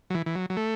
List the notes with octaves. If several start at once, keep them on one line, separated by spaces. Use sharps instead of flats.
F#3
E3
E3
F#3
F#3
A3